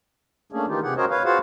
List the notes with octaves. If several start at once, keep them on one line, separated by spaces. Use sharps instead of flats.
A3 A#3 C#4 D4 G#4
D#3 E3 D#4 F4 G4
C3 G4 G#4 F#5
C#4 F#4 A#4 C5 C#5 D#5
B4 C#5 F5
F4 F#4 G#4 C5 F5 F#5